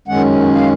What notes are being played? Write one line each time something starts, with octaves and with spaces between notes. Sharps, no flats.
F#2 D#3 G#3 C#4 F#5
F5